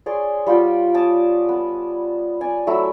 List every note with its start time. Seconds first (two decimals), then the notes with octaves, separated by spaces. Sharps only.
0.06 G#4 C#5 D5 C6
0.47 G3 F4 F#5 G5
0.94 C#5 A5 D6 D#6
1.49 B3
2.41 D5 G#5
2.67 F#3 A3 E4 E6